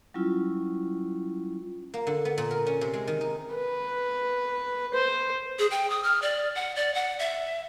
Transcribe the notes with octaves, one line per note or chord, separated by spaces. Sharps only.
F#3 G3 C#4 E4 F4
A#3
D3
B3
A#2
A#4
C#4
C3
G#3
D#3
D#4
B4
C5
G#4
G5
D#6
F6
D5
F#5
D5
F#5
E5